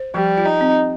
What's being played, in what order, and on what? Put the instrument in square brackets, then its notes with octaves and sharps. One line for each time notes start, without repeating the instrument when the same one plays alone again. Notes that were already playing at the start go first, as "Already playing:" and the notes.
Already playing: [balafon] C5
[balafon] F3 [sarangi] G3
[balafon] F4
[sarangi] D#4
[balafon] C4